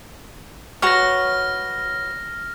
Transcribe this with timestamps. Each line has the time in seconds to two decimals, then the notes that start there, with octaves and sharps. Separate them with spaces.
0.82 F#4 B4 C#5 F6 A#6